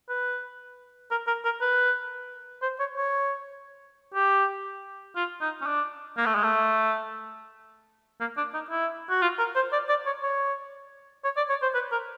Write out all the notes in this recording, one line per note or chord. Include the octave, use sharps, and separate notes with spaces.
B4
A#4
A#4
A#4
B4
C5
C#5
C#5
G4
F4
D#4
C#4
D4
A#3
A3
G#3
A3
A#3
D4
D#4
E4
F#4
F4
A#4
C5
D5
D5
C#5
C#5
C#5
D5
C#5
C5
B4
A#4